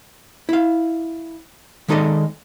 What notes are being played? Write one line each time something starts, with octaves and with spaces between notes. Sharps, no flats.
E4 F5
D#3 G#3 D#4 A4 D5 D#5